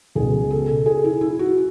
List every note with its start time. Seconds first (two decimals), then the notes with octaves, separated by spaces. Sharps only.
0.15 C#2 B2 G#4
0.51 A4
0.86 G#4
1.04 E4
1.21 E4
1.39 F#4